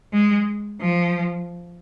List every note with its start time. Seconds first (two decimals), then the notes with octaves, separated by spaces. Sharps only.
0.13 G#3
0.80 F3